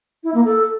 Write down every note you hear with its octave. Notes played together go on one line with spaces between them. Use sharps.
E4
A#3
A4